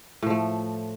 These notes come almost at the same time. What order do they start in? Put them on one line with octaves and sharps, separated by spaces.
A2 F3 A3